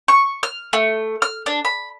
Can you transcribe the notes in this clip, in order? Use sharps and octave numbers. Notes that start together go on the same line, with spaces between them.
C#6
F6
A3
F6
D4
B5